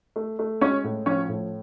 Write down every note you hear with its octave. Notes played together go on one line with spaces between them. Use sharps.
A3
A3
G#3 C#4 C#5
A2
F3 C#4 C#5
A2